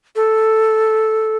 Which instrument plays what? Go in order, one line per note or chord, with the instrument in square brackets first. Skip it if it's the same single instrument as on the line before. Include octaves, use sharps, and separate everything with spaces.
[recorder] A4